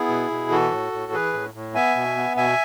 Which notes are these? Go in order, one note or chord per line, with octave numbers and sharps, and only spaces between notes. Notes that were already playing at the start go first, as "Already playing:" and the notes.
Already playing: B3 E4 G#4
B2
B2
E3 F#4 A4
A2
A2
E3 G#4 B4
A2
A2
B3 E5 G#5
B2
B3
B2 E5 G#5